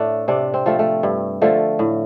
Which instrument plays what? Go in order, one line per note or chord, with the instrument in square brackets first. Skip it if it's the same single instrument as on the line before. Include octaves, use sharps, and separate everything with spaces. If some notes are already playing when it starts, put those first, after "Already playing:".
Already playing: [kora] A2 A3 D4
C3 D4
C4
F3 A3
A3
G2
D3 F3 A3
A2